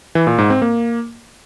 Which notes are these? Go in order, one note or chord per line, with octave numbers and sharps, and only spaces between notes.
E3
A#2
G#2
C4
A#3